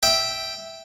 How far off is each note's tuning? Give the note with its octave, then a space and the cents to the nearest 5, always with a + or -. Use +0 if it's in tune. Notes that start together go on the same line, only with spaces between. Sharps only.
E5 -5 G5 +0